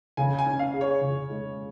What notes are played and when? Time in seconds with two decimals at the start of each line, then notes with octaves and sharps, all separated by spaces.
0.17 C#3 G#5
0.39 G#5
0.46 C#4
0.59 F5
0.74 G#4
0.81 C#5
1.01 C#3
1.30 G#3